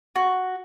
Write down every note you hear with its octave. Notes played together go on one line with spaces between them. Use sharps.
F#4